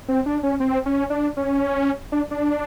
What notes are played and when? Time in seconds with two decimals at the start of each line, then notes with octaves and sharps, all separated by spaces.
0.08 C4
0.26 D4
0.43 C#4
0.60 C4
0.86 C#4
1.10 D4
1.37 C#4
2.12 D4
2.31 D4